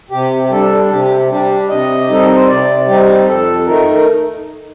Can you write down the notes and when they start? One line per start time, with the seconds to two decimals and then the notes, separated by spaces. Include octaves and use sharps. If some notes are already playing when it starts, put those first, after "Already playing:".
0.11 C3 G4
0.44 G4
0.50 G3 D4 A4
0.89 C3 G4
1.29 G3 D4 G4
1.69 C3 D#5
2.00 G4
2.09 G3 C4 D#4 A4
2.24 A#4
2.36 C5
2.48 C3 D5
2.87 G3 C4 D#4 G4
3.27 F2 A4
3.66 D#3 A3 D#4 A#4